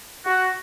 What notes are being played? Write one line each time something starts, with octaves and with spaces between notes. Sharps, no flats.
F#4